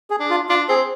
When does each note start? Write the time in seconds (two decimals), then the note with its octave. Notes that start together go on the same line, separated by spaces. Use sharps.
0.10 G#4
0.20 D4
0.30 F4
0.49 D4 F4
0.69 C4 G#4